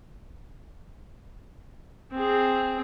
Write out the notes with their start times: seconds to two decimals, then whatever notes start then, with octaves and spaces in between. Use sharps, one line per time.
2.13 C4 G#4